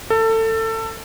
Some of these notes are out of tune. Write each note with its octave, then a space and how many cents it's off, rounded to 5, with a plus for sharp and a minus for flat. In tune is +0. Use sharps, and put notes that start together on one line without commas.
A4 +25